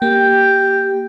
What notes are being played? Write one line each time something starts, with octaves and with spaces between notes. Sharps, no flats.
A#3 G4 G5